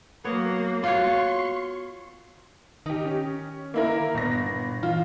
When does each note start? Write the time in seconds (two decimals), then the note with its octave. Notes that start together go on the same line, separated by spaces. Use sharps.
0.24 F#3 A#3 B3 C#5
0.84 F4 F#4 C#5 C6 C#6
2.86 D#3 D#4 G4
3.05 C#4
3.74 A#3 E4 A#4
4.15 G1 A#2 B3 A#6
4.83 E3 F4